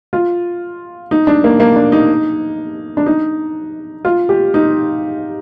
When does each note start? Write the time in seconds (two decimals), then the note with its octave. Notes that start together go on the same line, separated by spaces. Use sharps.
0.13 F4
1.11 D#4
1.27 D4
1.44 A#3
1.60 A#3
1.76 D4
1.92 D#4
2.97 D4
3.06 D#4
4.05 F4
4.29 G4
4.54 D#4